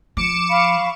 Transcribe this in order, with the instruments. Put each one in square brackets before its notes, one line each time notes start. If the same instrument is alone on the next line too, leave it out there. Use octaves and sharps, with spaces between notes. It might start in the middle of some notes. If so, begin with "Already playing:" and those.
[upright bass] F3 [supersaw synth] D6 C#7 E7
[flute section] F5 B5 C#6